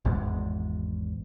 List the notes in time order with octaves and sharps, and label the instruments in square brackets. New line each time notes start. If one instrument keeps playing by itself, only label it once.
[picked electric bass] G#1 E2 G#2